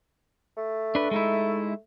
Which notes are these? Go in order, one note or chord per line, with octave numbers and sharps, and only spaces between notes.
A3
D4 B4
G#3 D#4 E4